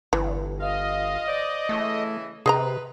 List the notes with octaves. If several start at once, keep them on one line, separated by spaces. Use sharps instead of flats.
G1 E3
F4 D#5 F5
C5 D5
C#3 E3 A3 E4
C3 G#4 B4 D#5 A#5